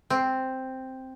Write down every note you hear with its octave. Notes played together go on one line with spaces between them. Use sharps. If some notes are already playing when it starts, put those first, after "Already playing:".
C4